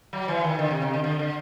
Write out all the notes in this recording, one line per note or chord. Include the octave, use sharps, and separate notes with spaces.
F#3
E3
D#3
D3
C3
C3
D3
D3
D3